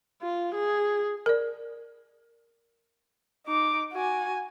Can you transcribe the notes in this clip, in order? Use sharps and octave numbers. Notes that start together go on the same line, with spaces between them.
F4
G#4
A#4 D5
D#4 D6
F#4 G#5